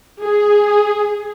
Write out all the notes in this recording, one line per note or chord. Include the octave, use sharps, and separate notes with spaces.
G#4